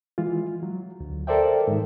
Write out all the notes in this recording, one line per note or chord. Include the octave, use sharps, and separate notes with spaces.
E3 G#3 F4
F#3
D2
A4 A#4 C5 D5 E5 G5
G#2 D#3